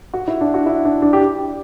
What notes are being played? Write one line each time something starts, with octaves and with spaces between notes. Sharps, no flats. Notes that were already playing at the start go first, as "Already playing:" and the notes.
F#4
E4
D4
F#4
E4
D4
D4
G4